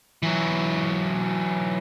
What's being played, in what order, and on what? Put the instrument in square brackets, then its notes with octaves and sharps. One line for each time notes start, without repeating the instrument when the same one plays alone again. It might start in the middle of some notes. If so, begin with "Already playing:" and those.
[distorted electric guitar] E3 F#3